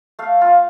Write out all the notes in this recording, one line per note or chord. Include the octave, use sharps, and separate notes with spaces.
A3 F5
F4